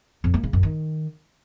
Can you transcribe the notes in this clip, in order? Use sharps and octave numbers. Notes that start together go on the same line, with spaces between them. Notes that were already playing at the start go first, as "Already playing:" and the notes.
F2
A#3
C#3
F#2
D#3